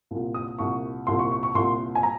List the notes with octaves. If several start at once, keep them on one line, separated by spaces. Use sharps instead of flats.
C2 A#2
D#6
C2 A#2 C#6
C2 A#2 C6
C#6
C#6
C#6
C2 A#2 C6
G#5
A#5